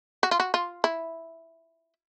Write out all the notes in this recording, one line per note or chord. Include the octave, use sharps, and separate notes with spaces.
F#4
F4
F#4
F4
E4